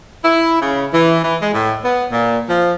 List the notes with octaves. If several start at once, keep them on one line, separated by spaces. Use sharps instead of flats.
E4
C#3
E3
E3
G#3
A2
B3
A#2
F3